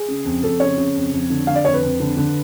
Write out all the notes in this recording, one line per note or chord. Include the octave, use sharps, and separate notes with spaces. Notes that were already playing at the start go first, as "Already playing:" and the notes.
Already playing: G#4
C#3
F2
F2 A4
C#3 C#5
C#3
F2
F2
D3
D3 F5
D5
F2 C#5
B4
F2
D3
D3